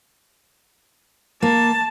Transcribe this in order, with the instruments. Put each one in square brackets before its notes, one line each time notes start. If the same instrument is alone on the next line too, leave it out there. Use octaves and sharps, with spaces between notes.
[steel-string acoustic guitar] A#3 [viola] A5